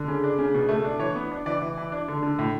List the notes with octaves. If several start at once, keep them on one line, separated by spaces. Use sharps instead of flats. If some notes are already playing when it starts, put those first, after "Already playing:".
Already playing: D3
C#3
D4
C#3
B2
A3
D4
E3 C#5
B3
D4
E3 D5
E3
E3
D4
D3
D3
A2